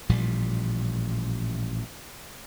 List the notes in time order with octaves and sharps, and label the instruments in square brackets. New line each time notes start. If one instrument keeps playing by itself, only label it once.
[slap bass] A1 A#2 F3 G3